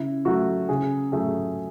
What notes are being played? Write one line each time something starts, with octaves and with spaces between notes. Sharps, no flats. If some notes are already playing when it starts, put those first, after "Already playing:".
Already playing: C#3 E4
F#3 A3 F#4
C#3 G#4
F#3 A3 G#4